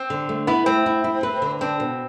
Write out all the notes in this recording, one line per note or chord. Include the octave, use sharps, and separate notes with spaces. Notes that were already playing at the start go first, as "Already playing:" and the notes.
Already playing: C4
D3
A3
B3 E4
A3 C4
E4
E4
B4
D3
C4 D4
B2